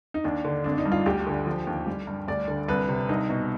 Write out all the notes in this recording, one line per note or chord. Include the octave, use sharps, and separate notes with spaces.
D#4
D#2 D4
D3
G#1 D4
D#4
G2
F4
D2 G4
D3
F3
D#2
G3
G2
D2 D5
D3
C2 B4
C3
C2 D#4
B2